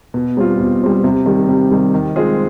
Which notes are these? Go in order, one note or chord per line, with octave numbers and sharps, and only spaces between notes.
B2
G3 C4 F4
B2
G3 C4 F4
C3
D#3 G3
C3
D#3 G3
D#3
G#3 C4 F4 G#4